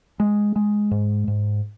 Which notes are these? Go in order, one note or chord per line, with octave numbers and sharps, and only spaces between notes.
G#3
G#3
G#2
G#2